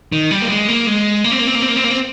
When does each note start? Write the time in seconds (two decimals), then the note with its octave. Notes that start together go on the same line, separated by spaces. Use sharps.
0.12 D#3
0.31 G3
0.42 A#3
0.50 G#3
0.69 A#3
0.87 G#3
1.24 A#3
1.32 C4
1.39 A#3
1.47 C4
1.55 A#3
1.62 C4
1.69 A#3
1.76 C4
1.84 A#3
1.90 C4